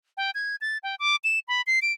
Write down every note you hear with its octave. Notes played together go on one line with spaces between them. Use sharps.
G5
G#6
A6
G5
D6
E7
B5
C7
D7